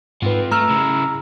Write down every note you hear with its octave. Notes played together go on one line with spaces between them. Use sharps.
G#2 F3 C4 B4
A3 A#5 E6 F6
C#3 E4